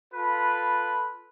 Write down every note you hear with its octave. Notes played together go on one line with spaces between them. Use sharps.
F4 A4 B4 B5